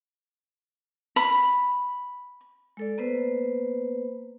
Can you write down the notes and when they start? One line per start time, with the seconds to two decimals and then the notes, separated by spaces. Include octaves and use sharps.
1.16 B5
2.77 G#3 A4 D5
2.98 A#3 B3 B4 C5